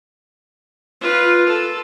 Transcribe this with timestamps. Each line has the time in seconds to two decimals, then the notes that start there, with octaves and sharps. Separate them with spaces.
1.01 F4 B4
1.46 A4